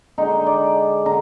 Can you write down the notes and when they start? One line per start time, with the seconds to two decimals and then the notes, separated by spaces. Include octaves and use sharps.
0.18 D3 G#3 D4 D#4
0.46 D5
1.06 D3 A#5